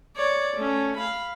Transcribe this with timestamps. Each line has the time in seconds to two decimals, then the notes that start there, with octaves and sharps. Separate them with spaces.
0.16 C#5 D5
0.57 A3 C#4
0.97 F5 B5